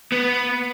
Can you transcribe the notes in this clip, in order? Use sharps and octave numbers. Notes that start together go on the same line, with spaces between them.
B3